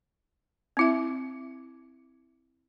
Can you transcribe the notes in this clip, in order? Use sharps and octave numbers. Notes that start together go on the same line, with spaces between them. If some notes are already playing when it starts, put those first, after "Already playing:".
C4 E4 E5